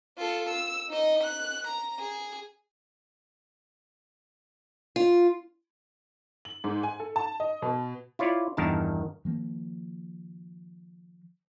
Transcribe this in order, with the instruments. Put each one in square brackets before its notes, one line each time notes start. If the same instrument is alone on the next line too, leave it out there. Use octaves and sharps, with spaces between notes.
[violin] F4 A4
E6
D#4 D#5
F#6
A#5
G#4
[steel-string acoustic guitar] F4
[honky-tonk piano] F#7
G#2
G#5
A4
A5
D#5
B2
[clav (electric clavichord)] E4 F4 C#5 D5
E2 G2 D#3 A#4 A5
[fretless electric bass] D#3 F3 A#3